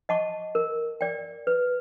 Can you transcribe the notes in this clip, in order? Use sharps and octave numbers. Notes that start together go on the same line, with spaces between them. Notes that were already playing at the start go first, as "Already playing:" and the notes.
D#5 F#5 A5 C#6
A#4
D5 G5
B4